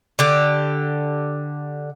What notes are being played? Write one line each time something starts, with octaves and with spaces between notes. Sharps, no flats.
D3 G4